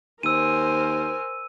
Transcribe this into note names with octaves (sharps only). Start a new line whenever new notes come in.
D#2 A#4 C5 G#5 E6 D#7